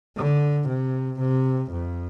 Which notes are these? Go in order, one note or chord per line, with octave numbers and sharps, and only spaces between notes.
D3
C3
C3
F2